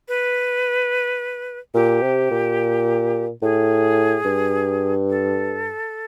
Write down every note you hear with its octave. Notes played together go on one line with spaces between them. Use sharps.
B4
A#2 G4
C3
A#2
A2 G#4
G2
A4